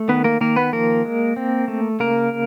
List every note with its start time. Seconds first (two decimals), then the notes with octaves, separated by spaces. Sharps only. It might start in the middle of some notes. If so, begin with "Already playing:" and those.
Already playing: A3
0.08 D#3 B3 B4
0.24 A#3 A#4
0.41 D#3 A#3 A#4
0.56 B3 B4
0.73 F3 A#3 A#4
1.05 G#3
1.36 C4
1.68 A3
2.00 C#3 A#3 A#4